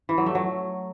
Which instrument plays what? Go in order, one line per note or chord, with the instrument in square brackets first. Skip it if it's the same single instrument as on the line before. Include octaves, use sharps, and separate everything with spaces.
[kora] E3
F#3
A3
F#3